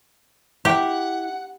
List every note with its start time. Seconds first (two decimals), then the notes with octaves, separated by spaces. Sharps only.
0.65 E4 G4 F#5